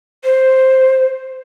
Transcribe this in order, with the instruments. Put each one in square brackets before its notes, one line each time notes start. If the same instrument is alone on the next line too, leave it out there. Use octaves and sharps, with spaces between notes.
[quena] C5